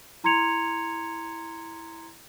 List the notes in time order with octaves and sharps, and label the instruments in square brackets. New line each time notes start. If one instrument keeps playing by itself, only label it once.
[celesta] E4 A#5 C6 G#6 C#7 F7